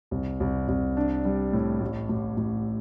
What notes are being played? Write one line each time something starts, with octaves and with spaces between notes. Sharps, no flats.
C2
C2
C2
D4
G3
A2
A1
A1
A1